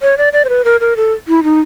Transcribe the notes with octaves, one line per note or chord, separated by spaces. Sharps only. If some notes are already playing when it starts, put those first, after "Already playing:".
C#5
D5
D5
C5
B4
A#4
A#4
A4
E4
D#4